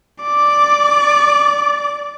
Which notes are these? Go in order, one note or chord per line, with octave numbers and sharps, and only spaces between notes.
D5 D6